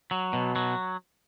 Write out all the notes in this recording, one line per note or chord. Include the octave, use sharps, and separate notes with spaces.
F#3
B2
F#3